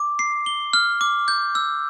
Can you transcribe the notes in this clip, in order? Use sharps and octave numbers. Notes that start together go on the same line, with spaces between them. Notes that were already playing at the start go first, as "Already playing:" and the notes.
Already playing: D6
C7
G7
F6
D6
G6
E6